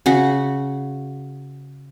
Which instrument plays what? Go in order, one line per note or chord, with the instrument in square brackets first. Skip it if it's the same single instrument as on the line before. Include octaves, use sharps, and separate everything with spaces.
[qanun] C#3 F#4